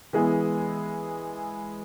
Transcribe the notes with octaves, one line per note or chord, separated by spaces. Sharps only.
E3 G#3 B3 E4